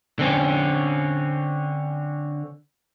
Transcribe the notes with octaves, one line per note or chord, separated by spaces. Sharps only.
D3 C4 C#4